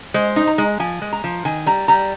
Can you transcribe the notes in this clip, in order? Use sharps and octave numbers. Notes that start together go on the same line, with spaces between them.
G#3 C5
D#4
A#5
G#3
F3 G#5
G#3
A#5
F3
D#3 G#5
G3 A#5
G3 A#5